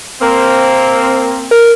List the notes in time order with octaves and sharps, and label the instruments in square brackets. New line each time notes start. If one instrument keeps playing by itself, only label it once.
[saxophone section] A#3 C4
[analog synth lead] A#4